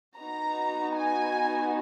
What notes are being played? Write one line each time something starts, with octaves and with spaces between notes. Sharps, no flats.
B3 D#4 F#4 A#5
G#5